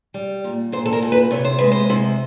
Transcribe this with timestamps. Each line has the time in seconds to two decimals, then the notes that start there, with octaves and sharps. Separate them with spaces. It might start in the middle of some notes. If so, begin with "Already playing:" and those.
0.14 G3
0.44 A#2
0.72 A#2 C5
0.86 A4
0.93 A#4
1.02 A#2
1.12 B4
1.31 C3 C#5
1.45 C5
1.59 G#3 B4
1.72 C5
1.90 C3